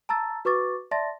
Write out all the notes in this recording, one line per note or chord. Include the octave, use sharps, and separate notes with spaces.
A5 A#5 E6 A6
F#4 B4 C#6 D6 A6
D5 E5 A5 C6 A6 A#6